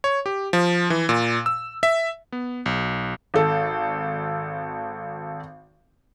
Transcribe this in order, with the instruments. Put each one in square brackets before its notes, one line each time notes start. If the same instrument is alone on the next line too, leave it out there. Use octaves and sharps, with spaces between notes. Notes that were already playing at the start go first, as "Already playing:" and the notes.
[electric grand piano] C#5
G4
F3
E3
A#2
E6
E5
B3
B1
[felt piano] G#1 A4